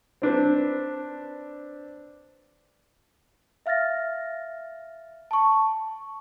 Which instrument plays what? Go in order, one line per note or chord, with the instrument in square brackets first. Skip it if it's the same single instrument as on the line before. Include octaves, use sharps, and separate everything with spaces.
[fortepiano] C4 D4 B4 C5
[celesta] E5 F5 F6 A6 A#6
A5 C#6